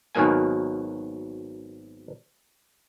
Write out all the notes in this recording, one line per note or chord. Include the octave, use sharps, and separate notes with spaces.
G#1 B2 D#3 F#3 A#3 G#5